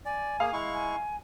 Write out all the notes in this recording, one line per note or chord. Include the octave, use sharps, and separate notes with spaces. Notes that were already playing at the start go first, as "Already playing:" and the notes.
D5 G#5
A#3 G#4 F5
G#3 E4 C#6
G#5